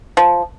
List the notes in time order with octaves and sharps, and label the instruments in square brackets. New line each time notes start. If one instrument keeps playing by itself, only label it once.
[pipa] F3